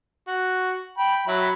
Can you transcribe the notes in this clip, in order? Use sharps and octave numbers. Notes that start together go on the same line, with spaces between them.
F#4
G5 B5
F#3 E4 B5